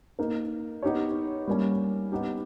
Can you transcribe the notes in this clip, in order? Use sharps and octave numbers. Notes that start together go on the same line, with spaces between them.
A#3 D#4 A#4
B3 D#4 G4 C#5
G3 A#3 C#4
B3 D#4 G4